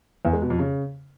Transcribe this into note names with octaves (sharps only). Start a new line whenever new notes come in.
E2
G#3
B2
F2
C#3